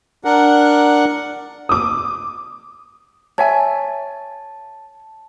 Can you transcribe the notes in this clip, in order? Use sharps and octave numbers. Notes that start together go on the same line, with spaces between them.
D4 A#4 F#5
D6 D#6
C#5 E5 G#5 A5